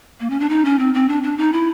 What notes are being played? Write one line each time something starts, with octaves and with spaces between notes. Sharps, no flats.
A#3
C#4
D4
D#4
C#4
C4
C4
D4
D4
D#4
E4